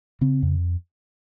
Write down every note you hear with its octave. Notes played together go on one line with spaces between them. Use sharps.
C#3 C4
F2